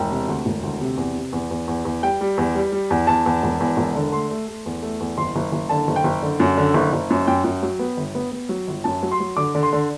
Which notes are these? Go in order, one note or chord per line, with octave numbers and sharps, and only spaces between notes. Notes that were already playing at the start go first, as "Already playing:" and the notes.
Already playing: E1 G5
C3
D2
E1
D2
C3
E2
C3
E2
E2
E2
E2
G3 G5
G3
E2
G3
G3
E2
E2 A5
E2
E1
E2
E1
D3
A3 C6
A3
A3
E2
A3
E2
F#1 C6
F#1
F#1
D3 A5
F#1
G5
F#1
D3
F#2
D3
F#1
F#1
F#2
F#2 G5
F#2
F#3
B3
G1
B3
B3
F#3
G1
F#2 A5
F#3
C6
F#3
D3 D6
D3
C6
D3